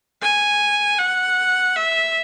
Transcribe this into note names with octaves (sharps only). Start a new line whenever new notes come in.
G#5
F#5
E5